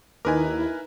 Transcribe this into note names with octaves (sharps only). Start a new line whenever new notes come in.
D#2 D#4 E4 A#4 B4 G#5 D6